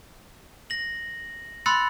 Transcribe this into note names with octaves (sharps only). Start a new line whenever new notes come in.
A#6 F#7
B5 C6 E6 F#6 A6 C#7